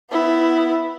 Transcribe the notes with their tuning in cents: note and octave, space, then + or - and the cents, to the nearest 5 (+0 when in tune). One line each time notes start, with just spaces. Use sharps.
B3 +20 E4 +0